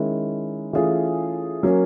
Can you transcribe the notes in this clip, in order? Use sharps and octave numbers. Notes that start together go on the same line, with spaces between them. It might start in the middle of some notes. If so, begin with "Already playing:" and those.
Already playing: D#3 G#3 C#4 E4
E3 A3 C#4 F4 G#4
F#3 A#3 C#4